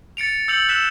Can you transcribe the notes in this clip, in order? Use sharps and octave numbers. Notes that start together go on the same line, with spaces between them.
A6 C#7 D7 F7
E6 G6 C#7 F7 F#7
E6 F#6 B6 E7 G7